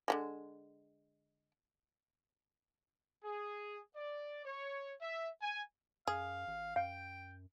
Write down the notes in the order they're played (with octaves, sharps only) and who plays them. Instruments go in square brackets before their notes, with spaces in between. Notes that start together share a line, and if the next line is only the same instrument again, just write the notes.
[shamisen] D3 G3 G#3
[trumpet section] G#4
D5
C#5
E5
G#5
[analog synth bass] F#2 [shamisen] G#4 [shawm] F5
[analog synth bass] A1
[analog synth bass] F#2 [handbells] F5 [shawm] G5